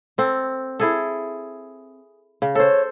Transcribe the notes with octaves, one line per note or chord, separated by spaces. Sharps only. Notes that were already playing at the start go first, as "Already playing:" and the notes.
C4 A4
E4 G#4 A4
C#3
A4 C5 C#5